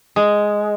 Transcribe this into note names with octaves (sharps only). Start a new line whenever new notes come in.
G#3